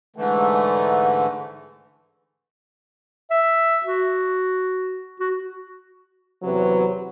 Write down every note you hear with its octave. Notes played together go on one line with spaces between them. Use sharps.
G#2 D3 E3 A3
E5
F#4
F#4
E2 C3 F#3 B4 C#5